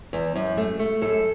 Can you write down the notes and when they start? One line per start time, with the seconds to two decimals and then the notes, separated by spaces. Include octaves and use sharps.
0.13 E2
0.36 F#2
0.57 A3
0.79 A3
1.01 F#2 A4